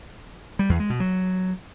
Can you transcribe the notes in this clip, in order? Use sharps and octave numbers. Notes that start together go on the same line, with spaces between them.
G3
E2
G#3
B2
F#3